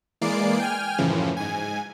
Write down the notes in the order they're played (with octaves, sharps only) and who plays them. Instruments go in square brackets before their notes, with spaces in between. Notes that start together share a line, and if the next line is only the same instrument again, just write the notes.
[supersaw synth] E3 G#3 A#3 D5 C7 D7
G5 G#5 F6
F#2 A2 C#3 E3 F3
G#2 G#5